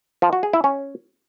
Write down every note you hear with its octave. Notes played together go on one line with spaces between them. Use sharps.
F3
F#4
G#4
E4
C#4